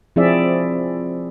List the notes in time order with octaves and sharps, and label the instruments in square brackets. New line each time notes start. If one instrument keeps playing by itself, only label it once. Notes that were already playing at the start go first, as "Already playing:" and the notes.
[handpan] F3 C4 E4 G#4 D5 E5